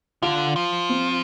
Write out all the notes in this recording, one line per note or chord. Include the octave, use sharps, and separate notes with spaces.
D3 F4
F3
C4